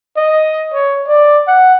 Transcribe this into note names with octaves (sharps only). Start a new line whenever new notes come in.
D#5
C#5
D5
F#5